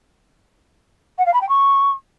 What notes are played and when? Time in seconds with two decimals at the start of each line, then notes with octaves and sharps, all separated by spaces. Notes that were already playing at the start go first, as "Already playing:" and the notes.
1.18 F#5
1.26 F5
1.33 B5
1.41 G5
1.49 C#6